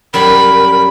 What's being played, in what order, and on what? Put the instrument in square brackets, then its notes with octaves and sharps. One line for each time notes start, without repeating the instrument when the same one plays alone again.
[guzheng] F#2 G3 [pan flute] A#4 [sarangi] B5